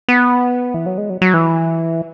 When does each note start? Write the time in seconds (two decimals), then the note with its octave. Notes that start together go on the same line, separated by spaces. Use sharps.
0.08 B3
0.74 E3
0.86 F#3
0.98 G#3
1.10 F#3
1.22 F#3
1.34 E3